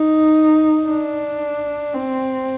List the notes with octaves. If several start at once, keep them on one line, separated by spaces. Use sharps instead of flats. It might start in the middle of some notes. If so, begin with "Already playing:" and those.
Already playing: D#4
D4
C4